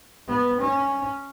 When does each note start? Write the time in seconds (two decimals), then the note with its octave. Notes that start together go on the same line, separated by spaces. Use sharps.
0.28 B3
0.60 C#4